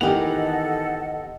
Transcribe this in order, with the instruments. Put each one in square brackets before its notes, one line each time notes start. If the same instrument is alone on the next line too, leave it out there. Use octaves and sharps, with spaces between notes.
[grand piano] D#3 E3 F7 [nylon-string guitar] B3 G4 [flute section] A4 D#5 [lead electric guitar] F#5